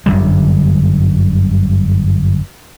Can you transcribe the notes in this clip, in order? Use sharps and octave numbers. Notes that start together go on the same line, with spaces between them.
G1 F#2 D3 G3